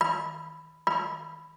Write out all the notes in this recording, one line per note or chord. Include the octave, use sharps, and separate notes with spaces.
B5
B5